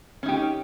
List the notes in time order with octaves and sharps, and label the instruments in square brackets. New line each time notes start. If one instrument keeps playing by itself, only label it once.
[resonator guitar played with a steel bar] C#4
D#4
G4